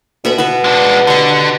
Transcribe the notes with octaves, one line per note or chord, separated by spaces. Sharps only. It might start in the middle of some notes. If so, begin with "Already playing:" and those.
D2 B2 E5 B5
B2 B3 B4 E5
G#3 D4
D3 G4 C#6